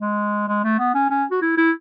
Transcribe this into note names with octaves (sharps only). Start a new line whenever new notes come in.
G#3
G#3
A3
B3
C#4
C#4
F#4
E4
E4